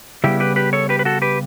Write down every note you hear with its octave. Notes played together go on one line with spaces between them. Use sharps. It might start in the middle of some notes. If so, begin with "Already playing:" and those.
C#3 G3 B3 E4 G4
G4 B4
G4 B4
A4 C#5
G4 B4
B4
F#4 A4
G4 B4